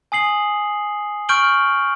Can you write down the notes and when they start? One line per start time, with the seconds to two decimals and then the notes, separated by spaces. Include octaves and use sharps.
0.12 G#5 D#6 C7 F#7
1.29 C#6 F6 G6 D7 F#7 G7